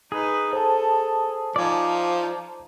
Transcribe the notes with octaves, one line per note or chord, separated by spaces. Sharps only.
D#4 G#4 B4
A4 C5 A5
F3 D#4 D5 G#5